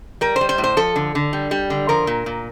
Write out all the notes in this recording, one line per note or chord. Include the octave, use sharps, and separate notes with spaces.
G3 A#4
C5
G3
C5
A2
C5
F3 A4
D3
D3
G3
G3
D3
F3 A#4
A#2
A#2